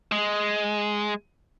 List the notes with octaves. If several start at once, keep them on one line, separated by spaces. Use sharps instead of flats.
G#3